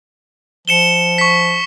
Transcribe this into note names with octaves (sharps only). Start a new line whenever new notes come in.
F3 C#7 E7 G7
C#6 B6